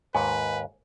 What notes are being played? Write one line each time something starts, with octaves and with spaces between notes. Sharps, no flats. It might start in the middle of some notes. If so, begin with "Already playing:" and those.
D#2 G#2 B4 G#5